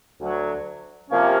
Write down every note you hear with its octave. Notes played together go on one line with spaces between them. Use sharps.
D2 D3 F#3
C3 F3 A#3 C#4